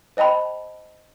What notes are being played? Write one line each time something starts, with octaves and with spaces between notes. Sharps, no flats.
C5 D#5 G5 A5 B5